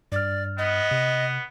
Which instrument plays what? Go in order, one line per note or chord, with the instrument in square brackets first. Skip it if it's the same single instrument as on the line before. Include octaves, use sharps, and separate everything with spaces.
[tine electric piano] G2 F6 [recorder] D5
[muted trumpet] B3 [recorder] D#5
[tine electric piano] C3